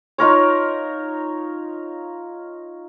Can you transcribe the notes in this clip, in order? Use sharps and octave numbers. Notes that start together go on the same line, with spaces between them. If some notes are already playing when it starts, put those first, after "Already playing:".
D#4 F4 A#4 C#5